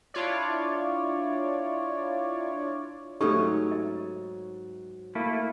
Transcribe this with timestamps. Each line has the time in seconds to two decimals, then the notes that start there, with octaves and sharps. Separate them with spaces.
0.14 D4 E4 F4 C#5 D5
3.21 G#2 F#3 A3 C#4 D#4 G4 A4
3.72 D#5
5.15 A3 A#3 E4